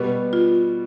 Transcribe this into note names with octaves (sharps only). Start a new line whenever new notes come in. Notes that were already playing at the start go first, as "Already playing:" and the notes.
Already playing: B2 G3 B3 B4
F4